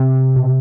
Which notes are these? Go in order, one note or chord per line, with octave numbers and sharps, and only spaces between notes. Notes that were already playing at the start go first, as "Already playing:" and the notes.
Already playing: C3 C4
B2